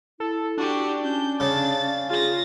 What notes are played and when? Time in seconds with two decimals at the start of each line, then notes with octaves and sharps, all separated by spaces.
0.20 E4 A4
0.58 D4 F#4 G4
1.04 C#4 G6
1.40 C#3 A6
2.10 F4 G#4 A6 A#6